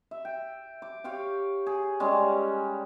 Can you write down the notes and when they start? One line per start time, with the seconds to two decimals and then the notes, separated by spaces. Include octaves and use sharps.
0.11 E5
0.25 G5
0.82 D6
1.04 G4 C#5 F5 G5
1.67 G#4
2.00 G3 G#3 C#4